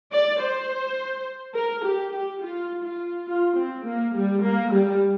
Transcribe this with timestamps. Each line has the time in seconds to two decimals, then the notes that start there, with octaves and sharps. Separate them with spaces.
0.11 D5
0.40 C5
1.55 A#4
1.84 G4
2.13 G4
2.41 F4
2.84 F4
3.27 F4
3.56 C4
3.85 A#3
4.14 G3
4.43 A#3
4.72 G3